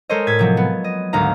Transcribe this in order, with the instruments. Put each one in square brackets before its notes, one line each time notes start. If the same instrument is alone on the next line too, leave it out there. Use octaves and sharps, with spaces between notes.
[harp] G#3 A4 A#4 C5 C#5 D#5
A2 G#6 A6 B6
C3 F3 F#3
B3
D#5
G#1 D2 F5 A#5